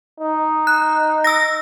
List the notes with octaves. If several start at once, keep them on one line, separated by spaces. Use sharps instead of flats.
D#4
F#6
E6 A#6